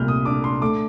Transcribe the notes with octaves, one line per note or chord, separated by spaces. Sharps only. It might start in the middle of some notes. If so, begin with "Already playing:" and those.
Already playing: C2 A#2 A3 F6 G6
D#6
D4 D6
C6
A3 D6